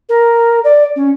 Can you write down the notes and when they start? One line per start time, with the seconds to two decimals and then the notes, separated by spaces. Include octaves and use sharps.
0.09 A#4
0.64 D5
0.96 C#4